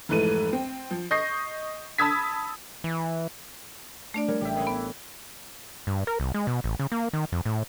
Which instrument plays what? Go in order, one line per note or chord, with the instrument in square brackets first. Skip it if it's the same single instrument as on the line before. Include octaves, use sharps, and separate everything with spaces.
[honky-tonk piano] F1 G#2 E3 A3 D#7
C4
F3
D#5 C#6 G6 A#6 C7
A5 B5 D#6 E6 G#6 B6
[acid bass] E3
[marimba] A3 D4 D5
[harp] G3 A#4 C#5
[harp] A1 [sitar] G4 E5
[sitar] C#3 G#3 B3
[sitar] E3 [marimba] B3
[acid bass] G2
A#4
C2
G#3
B2
A1
C#3
A#3
D#3
F2
A2